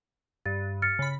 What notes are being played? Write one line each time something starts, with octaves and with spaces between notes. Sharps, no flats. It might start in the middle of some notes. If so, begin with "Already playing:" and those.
G2 A6
F6 A6 C#7
C#3 B5